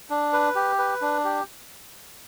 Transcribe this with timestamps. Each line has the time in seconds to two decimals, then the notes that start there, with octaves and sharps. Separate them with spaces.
0.10 D4
0.33 B4
0.55 G4
0.79 B4
1.02 D4
1.25 G4